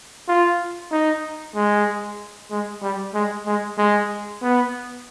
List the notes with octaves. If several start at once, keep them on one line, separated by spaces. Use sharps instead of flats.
F4
D#4
G#3
G#3
G3
G#3
G#3
G#3
B3